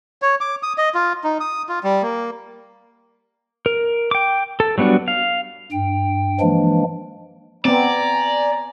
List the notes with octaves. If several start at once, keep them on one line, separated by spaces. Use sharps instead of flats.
C#5
D6
D#6
D#5
F4
D#4
D#6
F4
G3
A#3
A#4
G5 D6
A4
F#3 G3 B3 D4 F#4
F5
G2 G5
E3 F3 G#3 A#3 D4
B3 C4 D5 G#5 A#5